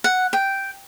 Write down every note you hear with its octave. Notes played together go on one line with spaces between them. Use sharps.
F#5
G5